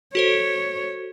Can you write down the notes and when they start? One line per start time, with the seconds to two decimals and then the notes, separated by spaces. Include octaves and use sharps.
0.15 F#4 A4 C5 C#5